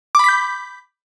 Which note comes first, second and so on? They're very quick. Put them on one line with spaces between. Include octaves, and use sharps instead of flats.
D6 B5 B6 G6